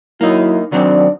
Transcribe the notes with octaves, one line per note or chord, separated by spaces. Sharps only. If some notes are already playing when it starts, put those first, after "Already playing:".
F#3 A#3 D#4 E4
D#3 F#3 C4 D4 D5